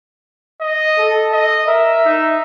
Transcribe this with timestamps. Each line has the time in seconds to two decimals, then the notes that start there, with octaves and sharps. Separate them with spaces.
0.61 D#5
0.99 A4
1.32 D#5
1.67 A#4 E5
2.05 D#4